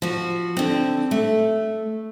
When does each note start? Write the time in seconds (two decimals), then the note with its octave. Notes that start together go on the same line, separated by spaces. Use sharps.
0.02 F3 F#4
0.57 D3 C4
1.11 A3